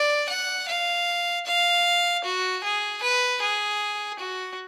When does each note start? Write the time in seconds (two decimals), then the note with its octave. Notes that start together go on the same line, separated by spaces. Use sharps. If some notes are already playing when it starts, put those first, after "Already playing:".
Already playing: D5
0.29 F#5
0.68 F5
1.47 F5
2.25 F#4
2.63 G#4
3.03 B4
3.42 G#4
4.20 F#4